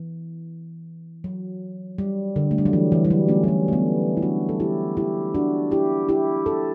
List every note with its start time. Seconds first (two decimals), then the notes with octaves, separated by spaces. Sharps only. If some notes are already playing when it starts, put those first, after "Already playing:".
Already playing: E3
1.24 F#3
1.98 G3
2.36 D3
2.51 A3
2.58 G3
2.66 F#3
2.73 E3
2.92 E3
3.05 G3
3.10 F#3
3.28 A3 C#4
3.44 G3
3.48 A3
3.68 A3
3.73 G3 B3
4.17 E4
4.22 D4 F#4
4.49 A4
4.60 E4 G4
4.97 E4 G4
5.35 D4 F#4
5.71 E4 G4
6.09 E4 G4
6.46 A4